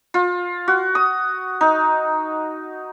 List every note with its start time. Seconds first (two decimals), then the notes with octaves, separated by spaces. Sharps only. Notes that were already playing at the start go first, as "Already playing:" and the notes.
0.14 F4
0.68 F#4
0.95 D#6
1.61 D#4